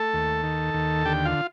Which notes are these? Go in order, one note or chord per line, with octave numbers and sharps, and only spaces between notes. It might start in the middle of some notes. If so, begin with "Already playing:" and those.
Already playing: A3 A4 A5
D#2
D#3
D#2
D3 G4 G5
F4 F5